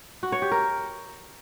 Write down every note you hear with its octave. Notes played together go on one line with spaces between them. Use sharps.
F#4
C#5
G4
A#4